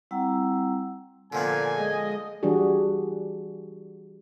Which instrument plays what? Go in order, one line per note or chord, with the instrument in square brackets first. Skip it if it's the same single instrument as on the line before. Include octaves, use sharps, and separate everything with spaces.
[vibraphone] G3 C4 E4 F#5 A#5 E6
[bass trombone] A#2 [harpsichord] D3 F3 B3 [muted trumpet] G#5
[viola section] G#3 D#5
[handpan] E3 G3 D4 F#4 G#4